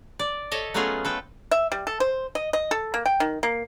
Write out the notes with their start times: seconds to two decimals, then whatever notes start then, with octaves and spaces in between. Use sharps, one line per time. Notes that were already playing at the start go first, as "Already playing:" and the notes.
0.19 D5
0.51 A4 C#5 D#5 E5
0.74 F#3 A3 B3 C#4 F4 G#4
1.05 A4 B4 G5
1.51 E5
1.72 G3
1.87 A4
2.00 C5
2.35 D#5
2.53 D#5
2.71 A4
2.94 A#3
3.06 G5
3.20 D#3
3.43 A#3